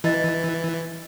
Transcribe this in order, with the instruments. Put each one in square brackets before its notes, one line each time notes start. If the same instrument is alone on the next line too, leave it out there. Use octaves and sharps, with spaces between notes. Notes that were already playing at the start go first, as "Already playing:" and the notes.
[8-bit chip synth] E3 [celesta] E4 D#5 A6